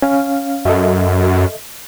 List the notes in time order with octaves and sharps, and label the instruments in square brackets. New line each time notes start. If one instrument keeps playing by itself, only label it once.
[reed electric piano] C#4 F5
[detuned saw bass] F#2 [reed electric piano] A4 D#5 E5